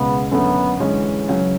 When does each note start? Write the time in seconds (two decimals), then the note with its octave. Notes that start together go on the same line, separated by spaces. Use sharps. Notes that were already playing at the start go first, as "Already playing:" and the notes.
Already playing: C#2 B2 G#3 B3
0.31 F#2 D3 A3 B3
0.80 D3 E3 G#3 C#4
1.29 C#3 F#3 C#4